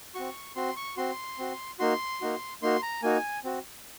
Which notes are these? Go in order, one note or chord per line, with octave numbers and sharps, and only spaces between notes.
C4 F#4 C#6
C4 F#4 C6
C#6
C4 F#4 C6
C4 F#4
A#3 D#4 F#4 C6
A#3 D#4 F#4
A#3 D#4 F#4 C6
A#5
A#3 D#4 F#4 G#5
C4 F#4